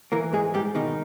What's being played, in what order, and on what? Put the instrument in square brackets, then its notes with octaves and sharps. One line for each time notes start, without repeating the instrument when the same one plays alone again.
[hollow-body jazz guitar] E3 A#3 A#4
G#2 G#3 G#4
G#2 G3 G4
B2 D#3 D#4